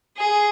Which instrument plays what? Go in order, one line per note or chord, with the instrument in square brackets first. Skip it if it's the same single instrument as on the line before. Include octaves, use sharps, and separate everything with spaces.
[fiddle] G#4